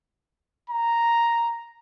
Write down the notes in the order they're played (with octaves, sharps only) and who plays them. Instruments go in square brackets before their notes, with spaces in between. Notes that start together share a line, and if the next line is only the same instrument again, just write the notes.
[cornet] A#5